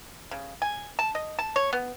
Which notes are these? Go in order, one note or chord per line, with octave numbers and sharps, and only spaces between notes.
C#3
G#5
A5
D#5
A5
C#5
B3